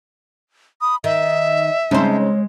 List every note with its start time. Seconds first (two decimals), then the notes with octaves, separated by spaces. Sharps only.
0.81 B5 D#6
1.04 D#3 D#5 E5
1.91 C#3 G#3 C4 D#4 C5 A5
2.20 C#5